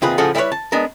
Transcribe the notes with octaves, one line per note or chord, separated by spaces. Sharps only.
D#2 C3 F4 G#4 B4
A2 C#3 F3 G#4 A4 F#5
G3 E4 G#4 A#4 B4 C#5
A5
G#3 B3 D4 A#4